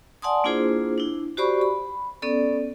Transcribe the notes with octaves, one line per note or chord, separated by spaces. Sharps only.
D5 F#5 G#5 A5 C6 D#6
A#3 D4 E4 F4 G#4 C5
D4 E4
F#4 G4 C5 D5 B5 C#6
B5
B3 C#4 A4 D5